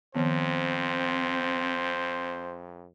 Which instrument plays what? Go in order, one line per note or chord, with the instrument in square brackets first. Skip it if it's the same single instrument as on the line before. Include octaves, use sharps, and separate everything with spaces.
[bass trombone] F2 [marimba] D#3 F3 B3 [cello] C4 [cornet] C5